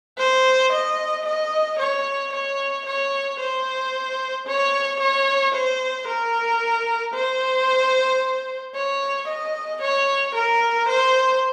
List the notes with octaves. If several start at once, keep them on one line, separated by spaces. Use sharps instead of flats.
C5
D#5
D#5
C#5
C#5
C#5
C5
C#5
C#5
C5
A#4
C5
C#5
D#5
C#5
A#4
C5